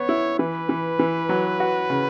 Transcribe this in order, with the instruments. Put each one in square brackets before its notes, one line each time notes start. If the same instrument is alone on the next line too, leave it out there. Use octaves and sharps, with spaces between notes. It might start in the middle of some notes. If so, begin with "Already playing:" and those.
Already playing: [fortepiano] B3 [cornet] C#5
[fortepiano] E4
[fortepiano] E3 [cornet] B4
[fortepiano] E3
E3
F#3
F#4
C#3